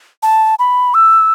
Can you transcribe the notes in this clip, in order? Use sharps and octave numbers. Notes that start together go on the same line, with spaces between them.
A5
B5
E6